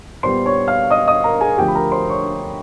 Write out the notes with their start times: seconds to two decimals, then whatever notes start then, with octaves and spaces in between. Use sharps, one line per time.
0.23 A#2 G3 B3 C5 C6
0.46 C#5 C#6
0.68 F5 F6
0.91 D#5 D#6
1.07 D#5 D#6
1.24 A#4 A#5
1.41 G#4 G#5
1.58 D2 D3 F3 A3 G4 G5
1.68 B5
1.75 A#4 A#5
1.92 C5 C6
2.09 C#5 C#6